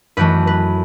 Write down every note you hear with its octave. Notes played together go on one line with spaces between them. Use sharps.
F#2 E3 A3 B4
B4